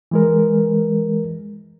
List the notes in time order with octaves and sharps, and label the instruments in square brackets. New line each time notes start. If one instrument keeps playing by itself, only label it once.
[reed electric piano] E3 G#3 A#4